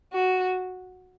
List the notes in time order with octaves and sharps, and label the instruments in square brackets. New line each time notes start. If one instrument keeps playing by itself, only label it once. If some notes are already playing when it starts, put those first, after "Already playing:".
[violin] F#4